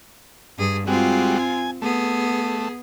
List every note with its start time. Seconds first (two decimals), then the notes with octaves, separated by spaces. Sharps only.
0.58 G2 G#4
0.87 G3 G#3 C4 F4 F#4
1.39 G#5
1.82 A3 B3 G#4